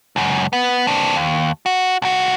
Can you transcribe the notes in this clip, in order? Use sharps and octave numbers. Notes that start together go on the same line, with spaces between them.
C#2 F#2
B3
C4 D4
D#2
F#4
C2 F#4